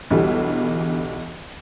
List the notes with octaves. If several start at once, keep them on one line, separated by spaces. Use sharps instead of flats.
B1 E2 D3 E3 G3